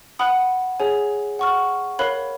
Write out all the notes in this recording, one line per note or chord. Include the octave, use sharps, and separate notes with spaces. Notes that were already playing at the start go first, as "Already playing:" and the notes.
F#5 B5 D#6 F#6
G#4 C#5 G#5
F#5 C#6 F6
A#4 C#5 F5 B5 F#6